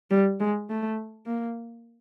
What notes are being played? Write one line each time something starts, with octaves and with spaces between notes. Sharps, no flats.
G3
G#3
A3
A#3